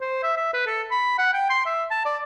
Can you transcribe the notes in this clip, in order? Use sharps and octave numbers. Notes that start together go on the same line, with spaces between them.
C5
E5
E5
B4
A4
B5
F#5
G5
C6
E5
A5
D5